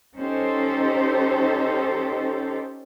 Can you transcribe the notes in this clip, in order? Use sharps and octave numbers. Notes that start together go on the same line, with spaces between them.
C#4 D#4 G4 A4 C5